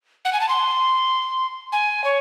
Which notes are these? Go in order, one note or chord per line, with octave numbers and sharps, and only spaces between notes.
F#5
G#5
A5
C6
G#5
C#5